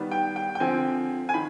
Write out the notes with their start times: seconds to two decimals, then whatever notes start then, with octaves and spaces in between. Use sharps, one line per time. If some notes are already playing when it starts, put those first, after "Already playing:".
Already playing: D#3 G3 B3
0.11 G5
0.36 G5
0.55 G5
0.60 D3 F3 C4 G#5
1.29 G#5
1.34 D#3 B5